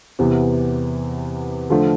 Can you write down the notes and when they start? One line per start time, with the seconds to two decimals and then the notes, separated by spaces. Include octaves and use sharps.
0.19 E2 C3 E3 B3
1.70 D3 F3 A3